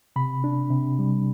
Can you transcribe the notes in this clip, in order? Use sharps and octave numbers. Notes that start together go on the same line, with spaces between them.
C3 B5
D4
C3
G3